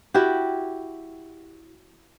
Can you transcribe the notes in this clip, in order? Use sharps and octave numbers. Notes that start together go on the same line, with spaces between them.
E4 F#4 G4